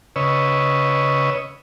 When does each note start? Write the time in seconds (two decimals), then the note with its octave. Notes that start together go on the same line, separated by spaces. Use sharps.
0.16 C#3 B4 C#5 D#5 E6